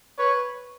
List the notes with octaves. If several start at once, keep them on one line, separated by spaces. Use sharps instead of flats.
B4 C#5